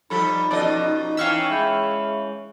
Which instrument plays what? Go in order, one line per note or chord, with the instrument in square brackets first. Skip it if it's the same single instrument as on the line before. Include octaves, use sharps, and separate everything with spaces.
[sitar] F3 G3 A4 [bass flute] D#4 [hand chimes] B5 B6
[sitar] B2 F3 D#5 [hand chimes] C#4 A5 [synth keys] D5
[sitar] E3 C#4 [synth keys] F5 C#6 E6 [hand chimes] G5 F6 B6
[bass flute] G#3 [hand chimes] E5 B5 G6